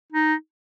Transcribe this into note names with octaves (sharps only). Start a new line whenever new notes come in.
D#4